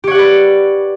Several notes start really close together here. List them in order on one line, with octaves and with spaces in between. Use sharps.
G4 C#5 F#5 D5 B4